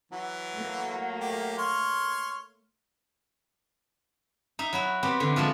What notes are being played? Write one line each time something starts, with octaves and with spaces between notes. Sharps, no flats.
E3 F#3
A3 A#3
G4
C#5 C6 F6
D#4 E5
F#3 E4 F#4
B3 C4 G4
D3 E3
F3 G#3 F#4 A4